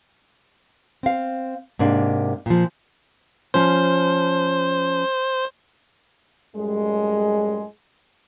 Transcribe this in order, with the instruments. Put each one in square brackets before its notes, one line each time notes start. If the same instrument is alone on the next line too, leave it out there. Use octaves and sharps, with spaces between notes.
[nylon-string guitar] C4 F5
G#2 C3 A#3 D4
A#2 F3
[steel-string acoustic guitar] F3 C#4 [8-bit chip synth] C5
[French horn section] F#2 A2 G3 G#3